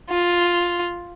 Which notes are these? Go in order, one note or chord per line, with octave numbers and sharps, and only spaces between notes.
F4